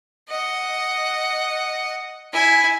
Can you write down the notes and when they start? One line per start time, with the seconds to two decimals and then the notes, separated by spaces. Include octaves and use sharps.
0.29 D#5 F#5
2.33 E4 G#5